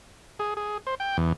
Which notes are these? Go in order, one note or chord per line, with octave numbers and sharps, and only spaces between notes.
G#4
G#4
C5
G5
E2